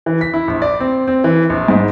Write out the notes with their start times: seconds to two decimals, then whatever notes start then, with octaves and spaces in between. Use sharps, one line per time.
0.06 E3
0.21 B6
0.34 E4
0.48 A#1
0.62 D5
0.80 C4
1.08 C4
1.24 E3
1.50 A#1
1.68 G#2